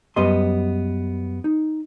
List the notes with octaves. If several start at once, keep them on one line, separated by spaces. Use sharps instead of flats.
F#2 G3 B3 D#5 C6
D#4